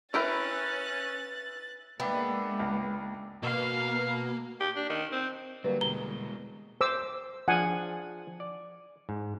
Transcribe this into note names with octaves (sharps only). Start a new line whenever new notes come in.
C#4 E4 A#4 B4 E5 G5 F#6 A6
G#3 A#3 B3 D4 E5 G5
C#2
B2 A#3 F5
G4
D4
D#3
C4
D3 F#3 G3 A#3 B4
B2 G#3 A#5 G7
C5 D6 E6
F3 D4 G#4 F#5 G#5
D5
G#2